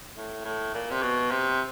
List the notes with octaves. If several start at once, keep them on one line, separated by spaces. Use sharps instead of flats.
A2
A2
A#2
C3
B2
C3